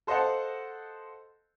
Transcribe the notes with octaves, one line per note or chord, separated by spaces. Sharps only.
A4 C5 D#5 F5 F#5 A5